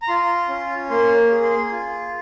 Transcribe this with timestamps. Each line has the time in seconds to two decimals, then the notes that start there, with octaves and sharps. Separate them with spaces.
0.02 A#5
0.08 F4 C6
0.49 C#4
0.90 A#3 C6
1.31 G#4
1.44 C6
1.72 F4